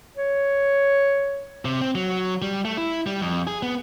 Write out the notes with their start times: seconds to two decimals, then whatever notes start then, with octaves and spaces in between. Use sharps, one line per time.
0.17 C#5
1.65 C3
1.81 C4
1.95 F#3
2.42 G3
2.65 A3
2.78 E4
3.06 G3
3.22 F2
3.47 G#4
3.62 B3